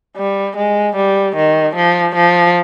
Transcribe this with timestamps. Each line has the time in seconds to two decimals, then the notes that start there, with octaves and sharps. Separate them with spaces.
0.17 G3
0.56 G#3
0.96 G3
1.36 D#3
1.76 F3
2.15 F3